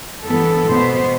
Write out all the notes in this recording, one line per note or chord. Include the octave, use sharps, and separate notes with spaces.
G2 E3 B3 A4
B2 B3 C5